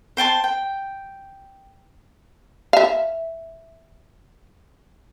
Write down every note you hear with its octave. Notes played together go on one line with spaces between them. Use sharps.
C5 G5 A5 C6
G5
E5 F5